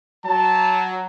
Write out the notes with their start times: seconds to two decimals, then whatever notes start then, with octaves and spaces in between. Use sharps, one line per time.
0.25 F#3 A5